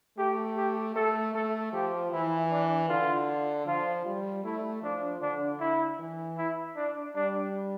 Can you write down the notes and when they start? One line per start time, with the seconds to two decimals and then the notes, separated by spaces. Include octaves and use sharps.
0.18 A3 G4
0.57 G4
0.96 A3 A4
1.34 A3 A4
1.73 F3 G4
2.12 E3 E4
2.51 D4
2.89 D3 F4
3.66 F3 F4
4.05 G3
4.44 A3 E4
4.82 F3 D4
5.21 D3 D4
5.60 E4
5.99 E3
6.38 E4
6.76 D4
7.15 G3 D4